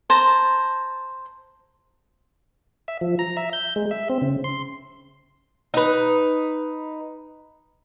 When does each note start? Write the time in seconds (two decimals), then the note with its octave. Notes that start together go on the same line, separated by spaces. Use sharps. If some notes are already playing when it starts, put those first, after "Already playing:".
0.10 C5 A5 A#5
2.88 E5
3.01 F3
3.19 A#5
3.37 E5
3.53 G6
3.76 G#3
3.91 E5
4.09 C4
4.22 C#3
4.44 C6
5.74 D#4 B4